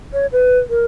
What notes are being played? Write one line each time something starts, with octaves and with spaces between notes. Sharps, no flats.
C#5
B4
A#4